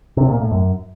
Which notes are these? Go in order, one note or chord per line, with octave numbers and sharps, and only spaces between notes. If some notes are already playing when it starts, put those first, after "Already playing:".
C3
A#2
A2
F#2